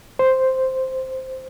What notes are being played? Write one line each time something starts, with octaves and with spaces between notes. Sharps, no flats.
C5